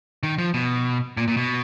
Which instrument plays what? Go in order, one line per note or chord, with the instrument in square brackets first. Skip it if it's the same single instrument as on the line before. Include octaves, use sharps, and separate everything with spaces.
[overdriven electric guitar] D#3
F3
B2
A#2
A#2
B2